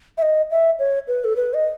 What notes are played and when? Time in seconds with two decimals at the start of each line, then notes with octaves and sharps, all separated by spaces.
0.18 E5
0.22 D#5
0.51 E5
0.79 C#5
1.08 B4
1.24 A4
1.36 B4
1.54 D#5